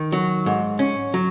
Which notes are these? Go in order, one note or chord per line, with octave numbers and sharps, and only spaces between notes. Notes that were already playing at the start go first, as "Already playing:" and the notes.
Already playing: D#3
F#3
G#2
C#4
F#3